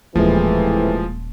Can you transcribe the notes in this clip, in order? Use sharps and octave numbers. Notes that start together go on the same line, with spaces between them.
D#1 A2 C3 E3 F3 G#3 A#3